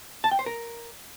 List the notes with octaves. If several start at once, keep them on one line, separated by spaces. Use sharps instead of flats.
A5
G5
C5
A#4